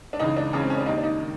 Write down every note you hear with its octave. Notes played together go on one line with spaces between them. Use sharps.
D4
C#2 C#3 E3 D#4
D4
C#2 C#3 E3 C#4
C4
C#4
D4
D#2 D#3 D#4
D4
D#4
D#3